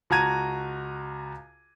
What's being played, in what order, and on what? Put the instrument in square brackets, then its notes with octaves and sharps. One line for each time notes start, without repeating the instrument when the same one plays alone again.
[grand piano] C#2 F#4 A5 A#5 G#6 D#7